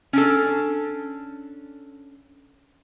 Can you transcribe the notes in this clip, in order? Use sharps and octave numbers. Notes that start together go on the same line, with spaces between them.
C#4 D4 A4